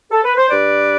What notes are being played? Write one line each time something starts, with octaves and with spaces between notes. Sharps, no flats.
A4
B4
C5
G2 B4 D5